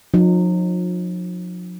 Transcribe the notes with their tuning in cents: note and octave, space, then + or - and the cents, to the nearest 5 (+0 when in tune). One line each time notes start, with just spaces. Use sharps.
F3 +45 D#4 -25